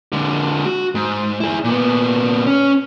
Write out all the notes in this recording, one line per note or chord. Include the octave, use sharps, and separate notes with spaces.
D3 G#3
F#4
G#2
E4 G#4
A#2 B3
C#4